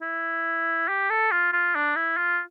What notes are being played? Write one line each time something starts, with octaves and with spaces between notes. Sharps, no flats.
E4
G4
A4
F4
F4
D4
E4
F4